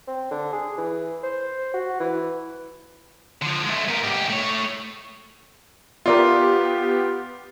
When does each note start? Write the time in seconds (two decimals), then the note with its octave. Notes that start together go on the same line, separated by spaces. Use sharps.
0.07 C4
0.31 D3
0.53 G#4
0.78 E3
1.23 C5
1.74 F#4
2.00 E3
3.42 D3 F3
3.65 G#3 A3
3.88 B3 A#4
4.03 G#2 G4
4.29 A3 C#5
6.06 B3 F4 G4 A#4 D5 E5